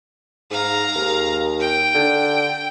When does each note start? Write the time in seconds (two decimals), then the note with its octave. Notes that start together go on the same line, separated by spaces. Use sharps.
0.51 G#2 F5 A#5
0.96 D#2
1.60 G5
1.94 D3